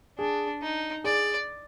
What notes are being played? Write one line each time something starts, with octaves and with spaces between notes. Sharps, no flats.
D4 G#4
D#4
G#4 D5